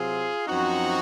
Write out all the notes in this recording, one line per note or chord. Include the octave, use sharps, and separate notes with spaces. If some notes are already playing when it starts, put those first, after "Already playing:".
Already playing: C3 F#3 C4 F4 G#4
F#2 F3 C4 D#4 F#4